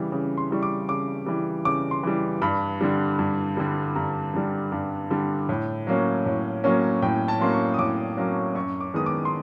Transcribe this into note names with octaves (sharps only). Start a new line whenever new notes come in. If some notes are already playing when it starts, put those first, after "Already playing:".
Already playing: C#3 E3 G3
C#3
C6
E3 G3 C#6
D6
C#3 D6
E3 G3
C#3 D6
C6
E3 G3
G2 B5
D3 G3
G2
D3 G3
G2 A#5
D3 G3
G2
D3 G3
A2
F#3 A#3 C#4
A2
F#3 A#3 C#4
A2 G5
A5
F#3 A#3 C#4 C6
C#6
D#6
A2 D6
F#3 A#3 C#4
F#2 C#6
D6
D#3 G#3 B3 D#6
D6
C6